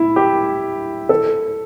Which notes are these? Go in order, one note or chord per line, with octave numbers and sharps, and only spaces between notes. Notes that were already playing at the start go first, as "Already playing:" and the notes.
Already playing: E4
G4
A4